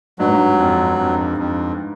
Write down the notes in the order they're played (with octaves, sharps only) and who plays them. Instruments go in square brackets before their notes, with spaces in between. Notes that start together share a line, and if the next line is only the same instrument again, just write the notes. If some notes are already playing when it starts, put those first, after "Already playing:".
[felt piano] G2 [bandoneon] F#3
[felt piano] G#2
G2
[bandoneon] F2
F2
F2